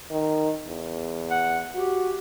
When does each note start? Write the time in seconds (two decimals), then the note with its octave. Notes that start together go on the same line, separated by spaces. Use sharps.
0.11 D#3
0.66 E2
1.31 F#5
1.75 F#4 G4